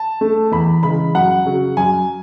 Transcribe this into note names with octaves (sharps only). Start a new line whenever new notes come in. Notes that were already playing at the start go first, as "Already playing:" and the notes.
Already playing: A5
A3
E2 B5
C#3 E3 G#3 B5
F#2 F#5
C#3 F#3
F#2 G#5